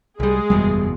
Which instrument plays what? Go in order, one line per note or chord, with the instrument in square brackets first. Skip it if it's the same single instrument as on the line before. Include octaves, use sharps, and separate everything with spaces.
[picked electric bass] C2 G3 [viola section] G#3 G#4
[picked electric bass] F#1 E2 B2 [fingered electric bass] G3